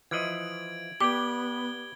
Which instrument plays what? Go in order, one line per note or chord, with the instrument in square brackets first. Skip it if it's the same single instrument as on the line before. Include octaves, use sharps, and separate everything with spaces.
[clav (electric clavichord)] E3 F3 D#5 [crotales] G#6 D7 F#7
[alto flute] B3 [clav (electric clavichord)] G4 D5 G5 [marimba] D6 [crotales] G#6 G7